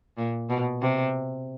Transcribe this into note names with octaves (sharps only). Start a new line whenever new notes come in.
A#2
B2
C3